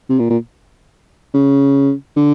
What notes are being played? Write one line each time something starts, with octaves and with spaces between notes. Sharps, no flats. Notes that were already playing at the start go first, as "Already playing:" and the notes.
C3
A#2
A#2
C#3
D3